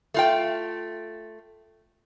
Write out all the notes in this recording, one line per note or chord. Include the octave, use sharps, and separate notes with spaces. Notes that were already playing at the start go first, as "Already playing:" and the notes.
A3 F4 G5